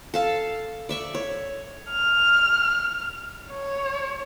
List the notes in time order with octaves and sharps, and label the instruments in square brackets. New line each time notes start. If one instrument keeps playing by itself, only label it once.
[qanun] A4 F5 A5
D5 E5 C#6
C#5
[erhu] F6
C#5